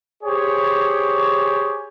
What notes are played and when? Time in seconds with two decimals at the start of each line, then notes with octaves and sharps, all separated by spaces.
0.23 G4 G#4 C5 C#5